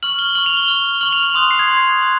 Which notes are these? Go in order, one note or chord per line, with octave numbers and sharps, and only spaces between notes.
C#6 F6 F#7
G7
C#6 F6 F#7
F7
G7
C#6 F6
C#6 F6 F#7
F7
F7
C6 D#6 F#6 F7
C7
G#6
C6 D#6 F#6
C6 D#6 F#6